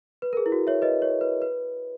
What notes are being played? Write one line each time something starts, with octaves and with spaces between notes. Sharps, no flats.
B4
A#4
G#4
E4
F#4
C#5 E5
B4 D#5
C#5
B4
B4